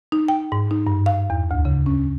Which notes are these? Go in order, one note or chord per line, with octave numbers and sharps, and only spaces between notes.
D#4
G5
G#2
D#4
G2
F5
E2
D2
C#3
C#4